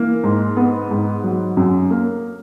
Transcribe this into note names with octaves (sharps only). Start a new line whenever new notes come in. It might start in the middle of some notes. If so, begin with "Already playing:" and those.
Already playing: E3 A#3
G#2
B3
G#2
F#3
F#2
A#3